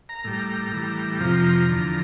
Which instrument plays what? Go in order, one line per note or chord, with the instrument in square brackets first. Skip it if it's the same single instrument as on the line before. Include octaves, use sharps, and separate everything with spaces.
[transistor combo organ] A#5
A2 G3
A2 E3 G3
F2 C3 F3 A#5
E2 D3 F3